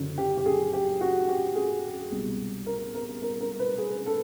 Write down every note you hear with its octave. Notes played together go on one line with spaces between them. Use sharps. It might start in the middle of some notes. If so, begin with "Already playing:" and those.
Already playing: F#1 F#2 D3
G4
G4
G#4
G4
F#4
G4
G#4
C2 B2 G#3
A#4
A#4
A#4
A#4
B4
G#4
A4